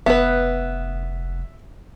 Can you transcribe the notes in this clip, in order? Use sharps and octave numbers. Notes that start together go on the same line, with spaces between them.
F1 B3 B4 E5